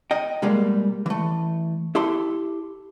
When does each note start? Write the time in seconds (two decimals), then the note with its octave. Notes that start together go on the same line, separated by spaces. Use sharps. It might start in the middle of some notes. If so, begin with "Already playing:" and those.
0.11 D#5 G5
0.42 B2 G3 G#3 A#3
1.06 E3 A3
1.95 E4 G4 A4 C6